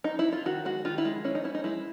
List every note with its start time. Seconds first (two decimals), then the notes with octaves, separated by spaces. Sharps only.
0.04 D#4
0.19 E4
0.33 F4
0.46 D#3 F#4
0.65 G#3 F#4
0.85 D#3 F4
0.98 E4
1.05 G#3
1.24 C#4 E4
1.35 D#4
1.44 C#4 E4
1.55 D#4
1.64 G#3 E4